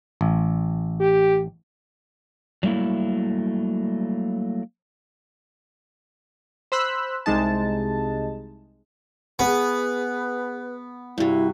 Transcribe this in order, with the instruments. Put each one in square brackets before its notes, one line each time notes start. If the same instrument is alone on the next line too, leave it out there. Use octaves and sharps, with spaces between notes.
[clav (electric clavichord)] A1
[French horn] G4
[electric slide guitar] F#3 G3 A3 A#3 E4
[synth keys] C5 B5 E6 F#6
C2 C3 G#3 D#4 A5
[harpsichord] B3 [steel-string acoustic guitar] G#4 [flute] B4
[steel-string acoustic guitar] G2 C3 [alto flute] E4 [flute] F#4